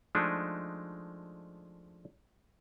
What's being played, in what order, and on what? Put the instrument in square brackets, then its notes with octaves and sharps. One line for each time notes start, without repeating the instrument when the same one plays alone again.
[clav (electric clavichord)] F3 G#3 A3 D4 D#4